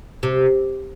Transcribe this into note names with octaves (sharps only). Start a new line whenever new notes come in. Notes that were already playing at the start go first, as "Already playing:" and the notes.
C3